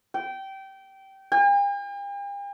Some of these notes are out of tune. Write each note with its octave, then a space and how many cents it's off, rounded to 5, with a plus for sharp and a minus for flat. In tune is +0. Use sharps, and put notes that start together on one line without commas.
G5 -20
G5 +45